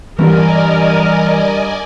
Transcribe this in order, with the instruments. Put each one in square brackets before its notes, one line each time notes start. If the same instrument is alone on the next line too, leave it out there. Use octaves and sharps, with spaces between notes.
[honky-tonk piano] G2 D3 G3 [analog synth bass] E3 [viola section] A#4 [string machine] D5 D#5 G#5